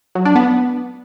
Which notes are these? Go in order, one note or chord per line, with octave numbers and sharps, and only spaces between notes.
F#3
D4
B3